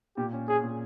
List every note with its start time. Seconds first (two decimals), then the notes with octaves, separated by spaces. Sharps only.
0.17 A#2 G4
0.33 C#4
0.48 C#4 G#4
0.63 A#2